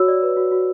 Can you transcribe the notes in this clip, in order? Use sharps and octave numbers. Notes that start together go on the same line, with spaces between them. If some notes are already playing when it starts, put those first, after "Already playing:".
Already playing: F#4 C#5 E6
D5
B4
F#4
F#4